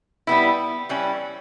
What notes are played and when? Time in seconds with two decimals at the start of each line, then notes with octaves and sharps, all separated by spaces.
0.27 G3 B3 E4
0.89 E3 G3 C#4